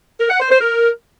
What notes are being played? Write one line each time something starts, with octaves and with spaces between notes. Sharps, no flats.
A#4
F#5
C5
C5
A#4